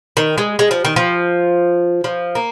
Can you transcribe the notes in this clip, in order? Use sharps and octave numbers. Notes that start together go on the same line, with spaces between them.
D#3
G#3
G#3
F3
D#3
F3
F3
A#3